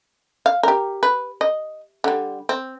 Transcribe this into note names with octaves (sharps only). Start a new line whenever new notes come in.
F5
G4 A#4
B4
D#5
D3 G3
C4